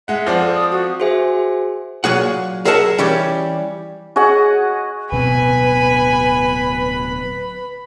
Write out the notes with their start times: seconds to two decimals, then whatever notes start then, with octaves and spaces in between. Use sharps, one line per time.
0.08 G#3 E5 F#5
0.27 F3 C4 C5 D5
0.40 A4
0.55 D#6
0.71 F#4
1.00 F#4 G#4 C5 E5 G#5
2.04 A#2 F#3 G#4 F#5
2.65 G#4 A#4 D#5 E5 F#5 A5
2.98 E3 G3 C#4 G4
4.16 F#4 G#4 D#5 F#5
5.12 D1 B2 C4 B4 G#5 B5